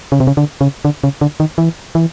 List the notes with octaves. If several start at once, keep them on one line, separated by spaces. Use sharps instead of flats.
C#3
C3
C#3
D3
C#3
D3
C#3
D3
D#3
E3
E3